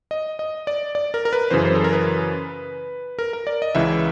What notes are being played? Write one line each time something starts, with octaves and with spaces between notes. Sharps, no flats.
D#5
D#5
D5
D5
A#4
A#4
B4
F#2 C#3 E3 C5
C5
A4
A#4
B4
A#4
A#4
D5
D#5
C#2 C#3 E3 E5